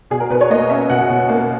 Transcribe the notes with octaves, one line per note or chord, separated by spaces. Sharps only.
B2 G#4
A#4
B2 B4
C#5
A#3 D#5
C#4 E5
B2 F#5
B2
A#3